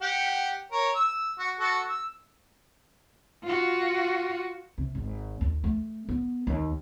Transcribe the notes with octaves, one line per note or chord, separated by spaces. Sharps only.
G4 F#5
A#4 C#5
E6
F#4
F#4 A4
E6
F4 F#4
C3
G#1
D#2
A3
B3
D#2